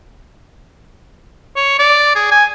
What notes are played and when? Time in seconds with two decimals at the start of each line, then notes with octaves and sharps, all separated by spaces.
1.56 C#5
1.79 D5
2.15 G#4
2.31 G#5